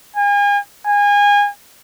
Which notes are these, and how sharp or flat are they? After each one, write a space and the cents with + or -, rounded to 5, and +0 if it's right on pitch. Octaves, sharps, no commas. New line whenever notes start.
G#5 -40
G#5 -30